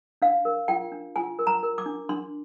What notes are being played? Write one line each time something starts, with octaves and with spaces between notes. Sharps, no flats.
D4 F5
A#4
F4 G5
D4
F4 G#5
A#4
A#5
A#4
D6
D4
D4 C6